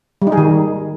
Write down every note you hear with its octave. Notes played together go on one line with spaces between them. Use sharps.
G3
D#4
G#4
D#3